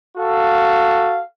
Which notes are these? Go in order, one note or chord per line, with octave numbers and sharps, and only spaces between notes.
F#4 A4 F5